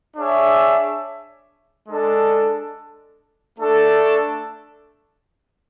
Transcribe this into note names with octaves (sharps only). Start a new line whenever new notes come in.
D4 G#4 C#5 E5
G#3 D4 A4
A3 D4 A4